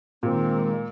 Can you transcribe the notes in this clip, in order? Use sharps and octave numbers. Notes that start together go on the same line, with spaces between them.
A#2 D#3 G#3 A#3 C4